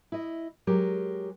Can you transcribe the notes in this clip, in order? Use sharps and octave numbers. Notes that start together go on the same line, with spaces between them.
E4 D#5
F#3 G#3 G4 A#4